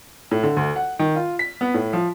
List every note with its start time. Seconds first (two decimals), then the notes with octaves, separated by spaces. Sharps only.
0.31 A2
0.43 D3
0.57 D2
0.76 F#5
0.99 D#3
1.16 F4
1.39 B6
1.61 B3
1.74 A2
1.93 F3